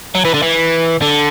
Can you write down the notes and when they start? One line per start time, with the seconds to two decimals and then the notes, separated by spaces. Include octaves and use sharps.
0.15 F#3
0.25 E3
0.34 D3
0.42 E3
1.02 D3